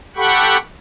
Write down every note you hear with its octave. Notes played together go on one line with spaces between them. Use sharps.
G4 A4 F#5 G5 B5 C#6